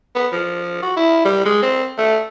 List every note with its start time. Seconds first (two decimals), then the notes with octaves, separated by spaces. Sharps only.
0.15 B3
0.32 F3
0.82 F#4
0.97 E4
1.25 G3
1.45 G#3
1.63 C4
1.98 A3